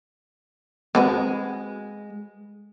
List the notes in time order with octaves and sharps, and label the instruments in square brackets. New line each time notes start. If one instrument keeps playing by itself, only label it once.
[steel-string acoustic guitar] G#3 [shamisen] C4 F#4 B4